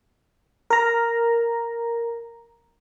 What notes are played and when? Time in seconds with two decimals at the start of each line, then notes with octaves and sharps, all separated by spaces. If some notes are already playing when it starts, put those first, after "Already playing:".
0.70 A#4 A#5